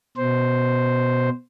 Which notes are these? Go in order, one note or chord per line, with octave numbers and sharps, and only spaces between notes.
B2 C5